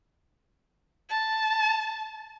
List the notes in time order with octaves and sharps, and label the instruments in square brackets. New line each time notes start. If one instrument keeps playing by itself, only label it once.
[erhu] A5